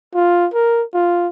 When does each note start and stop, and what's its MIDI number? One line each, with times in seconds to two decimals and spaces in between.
0.15 0.48 65
0.54 0.84 70
0.94 1.28 65